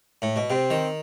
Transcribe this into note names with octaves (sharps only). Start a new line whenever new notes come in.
A2
B2
C3 C4
D#3